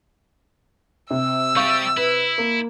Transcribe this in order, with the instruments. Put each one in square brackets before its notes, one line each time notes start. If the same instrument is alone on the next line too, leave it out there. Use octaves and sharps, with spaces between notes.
[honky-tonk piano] C3 [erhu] E6
[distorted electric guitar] G3 G4 [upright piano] F5 C#6
[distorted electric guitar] E4 [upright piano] B4
[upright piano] A#3